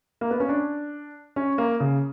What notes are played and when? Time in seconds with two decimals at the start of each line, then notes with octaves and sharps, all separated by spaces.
0.21 A#3
0.31 B3
0.40 C#4
0.49 D4
1.36 C#4
1.58 A#3
1.80 C#3